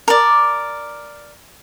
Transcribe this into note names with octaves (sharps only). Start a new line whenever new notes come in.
A#4 D5